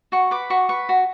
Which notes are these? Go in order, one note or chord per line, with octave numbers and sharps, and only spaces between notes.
F#4 C#6
B4 D6
F#4 C#6
B4 C#6
F#4